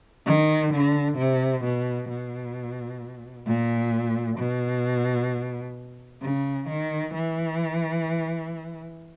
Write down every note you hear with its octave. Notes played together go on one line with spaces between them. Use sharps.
D#3
D3
C3
B2
B2
A#2
B2
C#3
D#3
E3